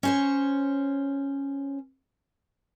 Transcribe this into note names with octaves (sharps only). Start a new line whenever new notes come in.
C#4 C5 C#5